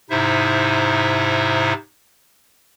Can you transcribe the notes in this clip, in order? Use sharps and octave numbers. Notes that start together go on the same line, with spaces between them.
G#2 C3 D#4 E4 C5 E5